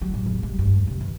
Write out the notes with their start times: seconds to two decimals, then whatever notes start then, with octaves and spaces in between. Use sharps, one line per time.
0.01 F#3
0.14 A2
0.26 E2
0.43 G3
0.59 G2
0.75 E2
0.87 C3
1.01 E3